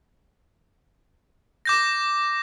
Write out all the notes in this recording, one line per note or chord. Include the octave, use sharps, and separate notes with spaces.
D6 G6 A#6